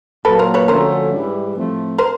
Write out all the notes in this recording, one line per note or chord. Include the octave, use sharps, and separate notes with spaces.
A#2 F#3 A#3 A4 B4
A#4 C5
B4 C#5
D3 F3 A3 C#4 F#4 A#4 C5
G#2 E3 G3
A2 F3 A3 C4
A#4 C5